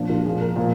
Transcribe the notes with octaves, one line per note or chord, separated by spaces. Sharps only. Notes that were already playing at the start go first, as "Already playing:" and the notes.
Already playing: A#2 F3 D4
F4
A#2 F3 G#4
A#4
A#2 F3